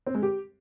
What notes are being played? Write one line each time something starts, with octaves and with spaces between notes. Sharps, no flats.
C4
G#3
G4